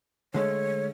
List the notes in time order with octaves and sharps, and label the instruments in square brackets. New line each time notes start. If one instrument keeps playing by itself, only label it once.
[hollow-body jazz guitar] D3 G#3 A3 [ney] C#5